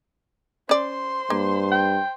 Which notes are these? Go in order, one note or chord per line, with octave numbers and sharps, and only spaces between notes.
C#4 C5 D5 C6
G2 A#3
G5